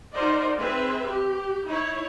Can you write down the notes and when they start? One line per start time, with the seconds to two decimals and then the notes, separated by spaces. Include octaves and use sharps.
0.14 D#4 F#4 A#4 C5 D5 D#5
0.59 C4 G#4 B4 E5
1.08 G4
1.66 D#4 E4 C#5